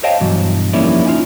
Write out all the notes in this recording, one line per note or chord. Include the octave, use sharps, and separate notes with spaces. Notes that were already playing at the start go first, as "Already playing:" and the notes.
C5 C#5 D#5 F5 G5 A5
G2 B2 E3 F#3
F2 D#3 G3 A#3 C#4 E4
C#4 D#4 F4